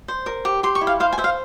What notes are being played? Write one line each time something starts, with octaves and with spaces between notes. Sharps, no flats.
C5
A#4
G4
G4 C6
C#6
E4
F5
C5 F5
G#5
C5 E5
F5